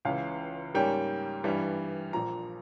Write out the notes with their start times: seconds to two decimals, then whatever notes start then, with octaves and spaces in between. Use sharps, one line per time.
0.05 C#2 C#3 E3 F5
0.75 G#2 G3 A#3 C#4 G5
1.44 G2 E3 G3
2.13 A#1 A#2 F3 A#5